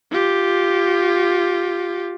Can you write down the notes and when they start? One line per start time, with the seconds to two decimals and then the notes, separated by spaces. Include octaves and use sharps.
0.11 F4 G4